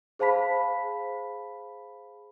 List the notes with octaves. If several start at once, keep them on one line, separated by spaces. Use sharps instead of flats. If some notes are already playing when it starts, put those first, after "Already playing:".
G#4 C5 F5 A5 B5 B6